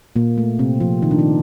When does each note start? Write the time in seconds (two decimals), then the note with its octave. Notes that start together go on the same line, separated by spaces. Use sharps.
0.16 A#2 A#3
0.38 A3
0.59 C3 C4
0.80 F3 F4
1.02 D#3 D#4
1.11 D4
1.19 D#3 D#4